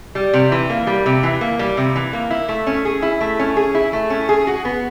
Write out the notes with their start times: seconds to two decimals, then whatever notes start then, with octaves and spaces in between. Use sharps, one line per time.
0.15 G3
0.33 C3
0.52 E3
0.70 A#3
0.87 G3
1.06 C3
1.23 E3
1.41 A#3
1.59 G3
1.77 C3
1.96 E3
2.13 A#3
2.30 E4
2.49 A3
2.67 C#4
2.85 G#4
3.02 E4
3.21 A3
3.39 C#4
3.57 G#4
3.75 E4
3.93 A3
4.10 C#4
4.29 G#4
4.47 F#4
4.65 B3